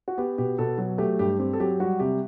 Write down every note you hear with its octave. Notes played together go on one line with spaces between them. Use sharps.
F#4
B3 G4
B2 G4
B2 A4
F#3
A3 G4
G2 G4
C4 G4
A4
F#3 G4
G3 F#4
C3 G4